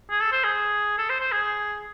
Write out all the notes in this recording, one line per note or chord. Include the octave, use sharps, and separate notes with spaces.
G#4
A4
C5
G#4
A4
C5
C5
G#4